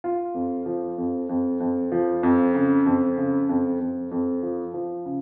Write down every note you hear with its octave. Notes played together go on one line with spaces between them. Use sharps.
F4
F2
F3
F2
F2
F2
F3
F2
C#3
F2
C#3
F2
F2
F2
F3
F3
C#3